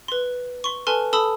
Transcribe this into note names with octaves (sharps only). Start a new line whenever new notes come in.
B4 C6
C6 C#6
A4 B4 G#5 A5 C6 F6
A4 A5 B5 D#6 E6 G7